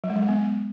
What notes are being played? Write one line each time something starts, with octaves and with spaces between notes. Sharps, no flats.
F#3
G#3
F#3
G#3
B3